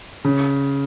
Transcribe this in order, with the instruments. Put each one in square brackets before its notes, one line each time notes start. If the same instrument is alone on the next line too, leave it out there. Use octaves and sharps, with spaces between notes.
[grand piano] C#3